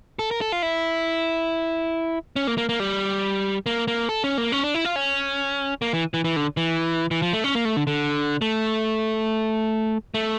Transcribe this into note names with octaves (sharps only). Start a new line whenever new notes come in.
A4
A#4
A4
F4
E4
C#4
A#3
A#3
A#3
G3
A#3
A#3
A4
C#4
A#3
C#4
D4
E4
F4
C#4
A#3
E3
E3
E3
D3
E3
E3
F3
A3
C#4
A#3
A3
D3
D3
A3
A3